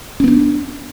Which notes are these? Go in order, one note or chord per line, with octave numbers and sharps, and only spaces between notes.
B3 C#4 D4